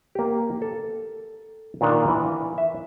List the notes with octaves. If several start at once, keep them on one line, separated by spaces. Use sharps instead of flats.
A#3 G4
A4
A#2 D#3 D4 A#4 F5
E3
E5